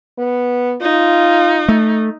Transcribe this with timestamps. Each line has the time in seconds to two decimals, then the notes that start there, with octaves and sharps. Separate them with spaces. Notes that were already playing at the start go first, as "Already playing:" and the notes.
0.19 B3
0.82 D#4 F4
1.68 A3